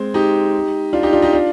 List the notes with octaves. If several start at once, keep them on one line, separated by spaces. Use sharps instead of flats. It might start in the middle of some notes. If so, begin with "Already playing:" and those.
Already playing: G#3 C4
D#4 G4
D4 F4
D#4 G4
D4 F4
D#4 G4
D4 F4